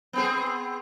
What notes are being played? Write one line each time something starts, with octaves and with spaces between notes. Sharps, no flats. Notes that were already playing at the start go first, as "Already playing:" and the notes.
B3 C4 G#4